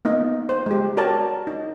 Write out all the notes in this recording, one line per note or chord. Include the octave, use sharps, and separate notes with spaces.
A#3 B3 D#4 D#5
C5
G#3 G4
F#4 A#4 C#5 D5 A5 A#5
D#4